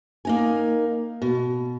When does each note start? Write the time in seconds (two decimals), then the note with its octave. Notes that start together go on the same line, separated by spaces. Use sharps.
0.25 A#3 D#4 G#5
1.22 B2